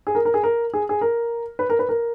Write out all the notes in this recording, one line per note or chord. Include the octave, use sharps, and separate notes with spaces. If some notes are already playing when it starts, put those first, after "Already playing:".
G#4
A#4
A#4
G#4
A#4
G#4
G#4
A#4
B4
A#4
B4
A#4